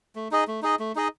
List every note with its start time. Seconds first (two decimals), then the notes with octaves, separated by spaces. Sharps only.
0.15 A3
0.31 D#4 G#4 D#5
0.47 A3
0.62 D#4 G#4 D#5
0.79 A3
0.95 D#4 G#4 D#5